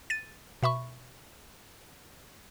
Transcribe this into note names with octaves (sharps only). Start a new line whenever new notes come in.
A6 D#7
B2 E5 B5 C#6